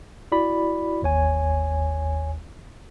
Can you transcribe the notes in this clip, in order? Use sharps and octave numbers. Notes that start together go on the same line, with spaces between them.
E4 F#4 D5 B5
G1 D#2 C#5 G#5